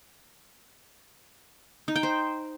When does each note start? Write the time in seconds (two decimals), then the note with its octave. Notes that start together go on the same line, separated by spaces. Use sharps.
1.88 D#4
1.96 G5
2.03 C5